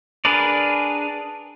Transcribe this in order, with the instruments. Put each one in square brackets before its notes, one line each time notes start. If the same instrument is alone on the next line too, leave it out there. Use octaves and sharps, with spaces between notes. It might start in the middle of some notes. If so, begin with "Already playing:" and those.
[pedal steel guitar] D4 G#4 A#4 B4 D5